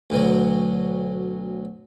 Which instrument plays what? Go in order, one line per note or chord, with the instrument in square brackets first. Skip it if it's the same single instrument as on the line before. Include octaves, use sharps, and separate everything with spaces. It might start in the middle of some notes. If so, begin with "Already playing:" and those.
[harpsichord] D2 B2 F#3